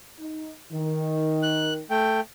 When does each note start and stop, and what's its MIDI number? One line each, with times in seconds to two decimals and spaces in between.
0.20 0.53 63
0.73 1.81 51
1.43 1.74 90
1.90 2.20 57
1.90 2.20 79